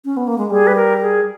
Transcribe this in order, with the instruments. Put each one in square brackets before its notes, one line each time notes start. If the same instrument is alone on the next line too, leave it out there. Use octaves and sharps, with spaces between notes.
[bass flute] C#4
B3
A#3
G#3
[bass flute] G3 [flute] G#4
[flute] B4
A#4
G#4